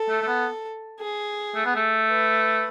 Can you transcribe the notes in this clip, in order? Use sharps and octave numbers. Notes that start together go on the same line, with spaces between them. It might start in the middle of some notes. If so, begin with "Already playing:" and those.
Already playing: A4
A3
A3
B3
G#4
A3
B3
A3
B4